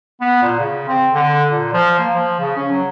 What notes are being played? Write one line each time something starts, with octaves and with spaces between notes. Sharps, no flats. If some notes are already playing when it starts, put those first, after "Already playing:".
B3
A#2
C#3
C4
D3
A#2
F3
A#3
F3
C#3
C#4
F#3